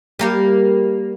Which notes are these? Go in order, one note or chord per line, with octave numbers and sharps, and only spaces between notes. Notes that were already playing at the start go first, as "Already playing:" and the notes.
G3 A#3 G4